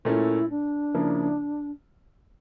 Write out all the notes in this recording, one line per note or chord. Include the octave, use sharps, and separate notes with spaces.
A#2 A3 C#4 E4
D4
C#3 F3 A#3 E4